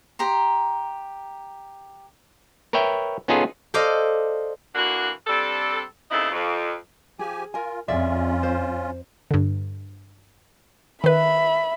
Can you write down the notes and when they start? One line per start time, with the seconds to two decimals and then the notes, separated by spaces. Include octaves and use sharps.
0.19 G4 A#5 C6
2.73 A#4 B4 C#5 E5 G5
3.28 B3 C#4 D#4 F4 G#4 A4
3.74 A4 C5 D5 D#5 F5
4.75 D3 E3 A#3 D4 F#4
5.27 G3 C4 D4 A4
6.11 D#2 C#3 C4 D#4 E4 A4
6.31 F2
7.19 F3 G4 G#4 G#5
7.54 F4 A#4 G#5
7.88 F2 C#4 F4 G#4 D5 E5
8.43 C5
9.31 G2 D3
11.04 D#3 B4 E5 B5